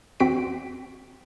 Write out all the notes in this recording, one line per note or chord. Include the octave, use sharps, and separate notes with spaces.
E2 C4 F#4 B6 D7